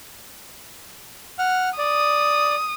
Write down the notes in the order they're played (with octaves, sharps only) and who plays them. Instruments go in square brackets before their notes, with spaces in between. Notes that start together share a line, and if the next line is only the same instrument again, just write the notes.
[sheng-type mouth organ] F#5 F6
[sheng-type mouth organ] D5 [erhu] D#6